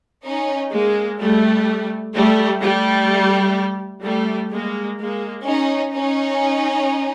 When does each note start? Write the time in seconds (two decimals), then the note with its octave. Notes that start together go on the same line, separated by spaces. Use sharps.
0.25 C#4 D#4
0.73 G#3 A#3
1.20 G3 A3
2.15 G3 A3
2.62 G3 A3
4.04 G3 A3
4.51 G#3 A#3
4.99 G#3 A#3
5.46 C#4 D#4
5.93 C#4 D#4